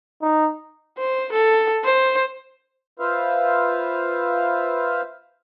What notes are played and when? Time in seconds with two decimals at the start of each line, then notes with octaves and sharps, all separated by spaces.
0.22 D#4
0.98 C5
1.32 A4
1.84 C5
2.99 F4 B4 C5 E5 F5